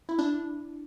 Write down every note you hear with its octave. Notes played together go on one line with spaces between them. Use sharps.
E4
D4